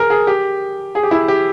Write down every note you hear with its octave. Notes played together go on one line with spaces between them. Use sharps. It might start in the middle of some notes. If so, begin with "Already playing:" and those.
Already playing: G#4 A#4
G#4
G4
G#4
G4
E4
G4